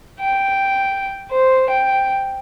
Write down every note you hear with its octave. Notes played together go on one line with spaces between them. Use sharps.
G5
C5
G5